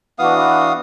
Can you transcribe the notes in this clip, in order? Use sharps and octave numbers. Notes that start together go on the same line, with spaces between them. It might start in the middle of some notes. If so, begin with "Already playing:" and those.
E3 B3 D4 F#4 F5 D#6